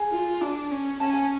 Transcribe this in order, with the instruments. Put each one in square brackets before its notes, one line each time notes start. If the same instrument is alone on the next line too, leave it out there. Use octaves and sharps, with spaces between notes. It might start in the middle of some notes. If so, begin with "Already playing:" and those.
Already playing: [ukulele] G#4 G#5
[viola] F4
D4
C#4
[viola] C#4 [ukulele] A5
[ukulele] G#5